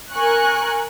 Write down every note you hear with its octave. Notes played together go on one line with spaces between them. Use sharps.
A#4 G#5 C#6 F#6